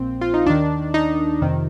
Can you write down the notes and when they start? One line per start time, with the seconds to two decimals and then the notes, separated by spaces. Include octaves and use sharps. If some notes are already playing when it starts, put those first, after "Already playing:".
Already playing: A#1 A#2 F3 C4
0.21 F4
0.34 D#4
0.46 D#2 D#3 D4
0.94 D#4
1.42 F2 C3 D#3